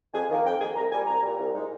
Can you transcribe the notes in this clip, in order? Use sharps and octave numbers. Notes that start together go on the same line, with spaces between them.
F2 G#5
D#3 A#3
F2 G5
D#3 A#3 G#5
C2 A#5
A#2 G3 G#5
C2 A#5
A#2 G3
C2
A#2 G#3 D#4